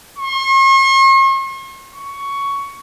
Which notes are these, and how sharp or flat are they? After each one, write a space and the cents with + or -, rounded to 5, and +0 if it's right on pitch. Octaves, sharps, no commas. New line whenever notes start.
C#6 -45
C#6 +10